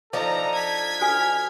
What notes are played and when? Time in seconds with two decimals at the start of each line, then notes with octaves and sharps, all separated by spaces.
0.13 F3 D4 D#4 A4 A#5
0.54 G#6 B6
1.01 F#4 A4 G#5 F6